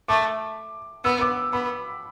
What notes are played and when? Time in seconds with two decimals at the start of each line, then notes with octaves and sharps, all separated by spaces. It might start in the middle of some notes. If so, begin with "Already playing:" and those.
0.08 A3 D6
1.04 B3 E6
1.21 D6
1.52 B3 B5